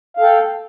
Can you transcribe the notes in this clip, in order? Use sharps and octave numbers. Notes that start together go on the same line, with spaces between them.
A4 F5 G5